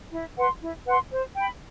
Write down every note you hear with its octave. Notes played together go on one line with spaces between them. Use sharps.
E4
B4 F#5 C6
E4
B4 F#5 C6
C5
G5 B5